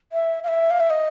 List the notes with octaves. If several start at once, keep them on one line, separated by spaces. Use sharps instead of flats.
E5
F5
E5
F5
E5
D#5